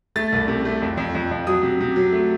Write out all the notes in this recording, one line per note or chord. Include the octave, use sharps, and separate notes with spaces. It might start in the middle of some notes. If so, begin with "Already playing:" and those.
A3 A6
C2
C3
A3
F2
F2
F2
F2
F#3 D#6
C3
C3
F#3
A3